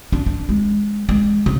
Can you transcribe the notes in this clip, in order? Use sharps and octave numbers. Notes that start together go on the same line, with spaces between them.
D4
D4
G#3
G#3
C#3